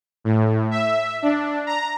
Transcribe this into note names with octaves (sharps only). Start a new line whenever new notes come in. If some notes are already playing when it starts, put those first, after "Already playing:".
A2
E5
D4
A#5